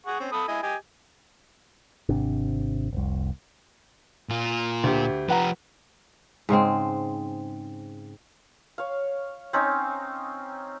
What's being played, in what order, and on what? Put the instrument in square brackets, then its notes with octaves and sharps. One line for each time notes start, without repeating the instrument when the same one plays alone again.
[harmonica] G#4 F#5 C#6
C4 C#4
A4 B5 D#6
E4 D#5 G#5
G4 D#5 G#5
[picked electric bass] G#1 C3 D4
F1 C2
[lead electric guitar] A#2 F4
[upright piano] D2 G4
[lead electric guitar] F3 G4 [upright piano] B4 F#5 A#5
[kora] G#2 C#3 G#3 C4
[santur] C#5 F5
C4 C#4 D#4